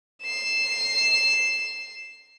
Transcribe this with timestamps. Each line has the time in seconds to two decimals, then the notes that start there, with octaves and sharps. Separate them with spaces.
0.22 C7 E7